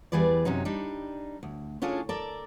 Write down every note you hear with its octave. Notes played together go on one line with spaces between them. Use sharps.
E2 E3 G3 G#4 B4 D5
F#2 C3 F#3 C#4 D#4
G3 D4 D#4
D2
C#4 D4 F4 G#4 A4
A4 A#4 D5